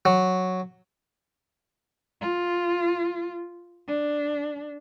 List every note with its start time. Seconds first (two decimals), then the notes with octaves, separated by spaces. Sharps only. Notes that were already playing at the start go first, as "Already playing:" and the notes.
0.05 F#3
2.21 F4
3.88 D4